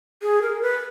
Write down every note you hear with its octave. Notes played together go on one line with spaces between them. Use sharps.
G#4
A#4
B4